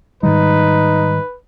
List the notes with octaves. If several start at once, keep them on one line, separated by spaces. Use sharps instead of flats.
G#2 D#3 G3 D#4 B4